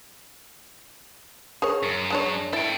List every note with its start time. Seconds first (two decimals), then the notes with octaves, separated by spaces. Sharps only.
1.62 G#4 A#4 C#5
1.83 F#2
2.10 G#3 D4 C#5
2.53 E4 A4 G5